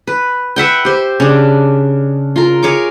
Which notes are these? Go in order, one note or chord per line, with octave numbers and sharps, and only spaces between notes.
B4
B4 E5 F#5 G5
G4 C5
C#3 D4
F4 A#4
G#4 A#4 C#5 D6